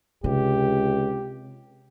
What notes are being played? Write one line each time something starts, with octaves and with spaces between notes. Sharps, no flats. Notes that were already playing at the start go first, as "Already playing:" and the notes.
C#2 C3 G4